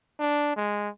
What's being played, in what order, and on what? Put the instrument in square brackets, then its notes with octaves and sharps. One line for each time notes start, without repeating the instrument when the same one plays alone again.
[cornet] D4
G#3